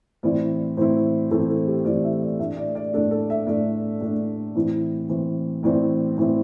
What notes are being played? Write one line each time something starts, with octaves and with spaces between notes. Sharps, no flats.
A2 E3 C4 E4 D5
A2 E3 C4 E4 C5
A2 E3 C4 E4 A4
A4
G4
A2 E3 C4 E4 D5
E5
D5
A2 A3 D4 E5
D5
D5
A2 A3 D4 A4
A4
E5
A2 A3 D4 D5
A2 A3 D4
A2 E3 C4 E4
A2 E3 C4 E4
A2 E3 C4 E4 D5
A2 E3 C4 E4